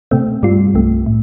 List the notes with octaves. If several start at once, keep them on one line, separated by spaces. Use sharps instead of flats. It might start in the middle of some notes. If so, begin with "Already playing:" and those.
C3 A3 C4
G2 G3 F4
C2 C3 A3
A2